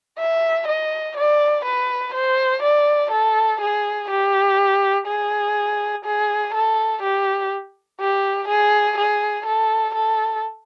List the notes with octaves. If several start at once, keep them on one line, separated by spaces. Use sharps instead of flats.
E5
D#5
D5
B4
C5
D5
A4
G#4
G4
G#4
G#4
A4
G4
G4
G#4
G#4
A4
A4